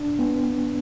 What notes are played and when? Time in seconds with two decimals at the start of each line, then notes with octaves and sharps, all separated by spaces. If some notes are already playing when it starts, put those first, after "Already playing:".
Already playing: D4
0.19 B3